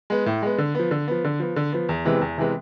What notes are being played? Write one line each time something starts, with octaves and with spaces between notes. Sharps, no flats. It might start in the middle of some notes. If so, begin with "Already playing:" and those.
G#3 B3
A2
G#3 B3
D3
F3 B3
D3
F3 B3
D3
F3 B3
D3
F3 B3
E2
C3 E3 G#3 B3
E2
C3 E3 G#3 B3